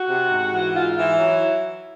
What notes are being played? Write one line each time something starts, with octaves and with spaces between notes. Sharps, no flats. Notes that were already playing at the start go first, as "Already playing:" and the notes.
Already playing: F#4
C3
G#2
E3
G#2 F4
E3 E4
F#3